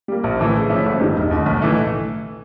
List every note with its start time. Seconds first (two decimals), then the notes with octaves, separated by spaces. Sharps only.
0.08 G3 A#3
0.24 A#1
0.39 A2 E3 A3
0.55 C#3
0.69 F3 A3 C#4 E4
0.85 G#1
1.01 G2 D#3 G3
1.16 E1
1.31 D#2 D3
1.46 B1
1.62 A2 E3 A3